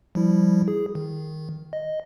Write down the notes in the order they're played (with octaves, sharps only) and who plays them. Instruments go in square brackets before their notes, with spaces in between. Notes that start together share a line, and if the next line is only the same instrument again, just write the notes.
[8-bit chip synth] F3 G3 E4
G#4
D#3
D#5